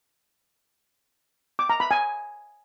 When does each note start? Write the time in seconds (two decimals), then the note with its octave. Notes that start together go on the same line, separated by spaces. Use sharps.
1.59 D6
1.70 A#5
1.80 B5
1.91 G#5